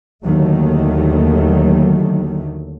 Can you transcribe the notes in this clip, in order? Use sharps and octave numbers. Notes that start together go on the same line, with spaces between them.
D#2 D3 D#3 F#3 A3